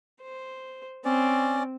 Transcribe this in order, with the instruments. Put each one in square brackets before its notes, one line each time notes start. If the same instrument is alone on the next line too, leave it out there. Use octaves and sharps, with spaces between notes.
[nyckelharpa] C5
[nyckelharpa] C4 [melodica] C#4 D5